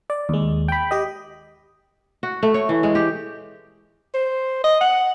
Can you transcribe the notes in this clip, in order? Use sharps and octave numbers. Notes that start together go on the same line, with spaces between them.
D5
D#2 G#3
G5 B5
G4 D#5
F#4
A3
C#5
E3
G#3
G4
C5
D#5
F#5